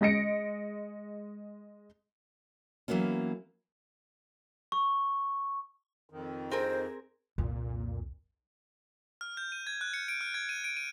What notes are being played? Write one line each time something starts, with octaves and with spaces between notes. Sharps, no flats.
G#3 D#5 A#6 C#7 D7
E3 F#3 A#3 B3 C#4
C#6
F2 D#3
C4 G#4 A#4 C5
C2 F2 A#2
F6
G6
D#7
G#6
F#6
C#7
D7
F6
G#6
D#7
D7
D#7